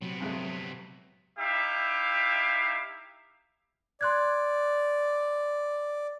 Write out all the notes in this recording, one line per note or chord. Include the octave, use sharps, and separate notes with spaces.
C3 F#3 B3
F2 G#3 A3
D#4 E4 G4 E5 F5
D5 C6 F#6 G#6